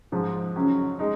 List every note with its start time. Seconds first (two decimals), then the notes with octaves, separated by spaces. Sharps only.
0.12 G#2 F3 G#3
0.55 F#2 C#3 F#3 C#4
0.99 G#3 D#4